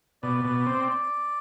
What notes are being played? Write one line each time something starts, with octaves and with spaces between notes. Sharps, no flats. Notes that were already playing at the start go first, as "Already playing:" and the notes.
B2 D5
B2
C4